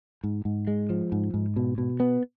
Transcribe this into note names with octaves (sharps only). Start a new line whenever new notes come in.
G#2
G#2
G#3
F3
G#2
G#2
B2
B2
B3